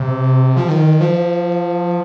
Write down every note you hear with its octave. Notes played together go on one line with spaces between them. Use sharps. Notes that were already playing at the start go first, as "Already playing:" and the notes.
Already playing: C3
F3
D#3
F3